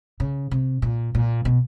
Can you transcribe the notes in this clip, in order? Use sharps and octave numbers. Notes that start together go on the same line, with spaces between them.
C#3
C3
A#2
A#2
B2